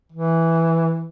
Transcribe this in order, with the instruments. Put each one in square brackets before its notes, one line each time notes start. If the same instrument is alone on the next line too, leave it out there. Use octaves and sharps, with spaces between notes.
[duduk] E3